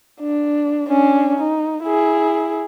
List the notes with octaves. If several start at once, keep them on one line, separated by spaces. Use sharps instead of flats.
D4
C#4 D4
D#4
E4 G#4